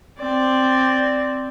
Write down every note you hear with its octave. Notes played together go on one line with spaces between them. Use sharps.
C4 D5